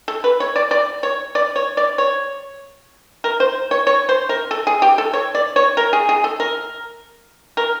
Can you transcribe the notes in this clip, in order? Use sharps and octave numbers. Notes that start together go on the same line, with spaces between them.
A4
B4
C#5
D5
D5
C#5
D5
C#5
D5
C#5
A#4
C5
C#5
C#5
C5
A#4
A4
G#4
G4
A4
C#5
D5
C#5
A#4
G#4
G#4
A4
A#4
A#4